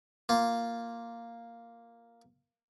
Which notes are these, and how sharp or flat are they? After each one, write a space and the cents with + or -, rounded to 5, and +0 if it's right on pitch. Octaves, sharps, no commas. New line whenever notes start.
A#3 +0 F4 +0